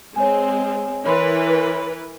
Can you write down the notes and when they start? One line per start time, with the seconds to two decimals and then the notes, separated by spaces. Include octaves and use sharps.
0.16 G#3 C4 C#5 G#5
1.05 E3 A#4 B4 C#5 B5 C6